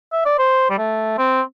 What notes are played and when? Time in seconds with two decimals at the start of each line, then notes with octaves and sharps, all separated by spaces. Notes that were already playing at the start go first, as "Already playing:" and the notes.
0.12 E5
0.25 D5
0.39 C5
0.70 G3
0.78 A3
1.18 C4